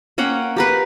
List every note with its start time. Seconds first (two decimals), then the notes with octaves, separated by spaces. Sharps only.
0.18 A#3 C#4 F#5 G5
0.56 G4 A#4 B4